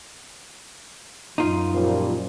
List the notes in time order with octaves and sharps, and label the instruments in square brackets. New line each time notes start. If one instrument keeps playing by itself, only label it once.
[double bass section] F#2 [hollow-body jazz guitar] D#4 F4
[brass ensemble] A#2 F3 G3